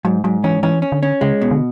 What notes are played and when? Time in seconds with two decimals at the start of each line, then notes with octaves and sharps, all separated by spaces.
0.05 G#2 F#3
0.24 G#2 F#3
0.44 E3 C#4
0.63 E3 C#4
0.82 C#4
0.92 D3
1.03 C#4
1.21 C#3 G#3
1.41 B2
1.51 D3